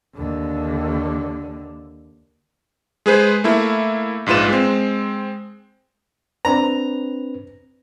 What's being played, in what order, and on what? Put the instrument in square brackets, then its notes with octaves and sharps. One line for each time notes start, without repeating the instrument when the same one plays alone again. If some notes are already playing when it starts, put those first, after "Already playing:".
[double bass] D#2 D3
[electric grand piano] G#3 G#4 B4 C5
A3 A#3 E4
A#1 G#2 F4 B4 E7
G#3 C4
[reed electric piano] C4 D4 B4 [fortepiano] A#5